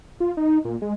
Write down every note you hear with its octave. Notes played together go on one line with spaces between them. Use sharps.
F4
D#4
A#2
G#3